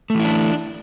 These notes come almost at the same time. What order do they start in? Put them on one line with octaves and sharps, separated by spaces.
A3 E3 E4 D4